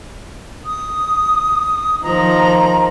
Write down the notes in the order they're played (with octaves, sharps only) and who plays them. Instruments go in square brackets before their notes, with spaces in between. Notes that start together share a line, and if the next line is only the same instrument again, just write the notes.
[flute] D#6
[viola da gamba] D#3 F3 [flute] A#5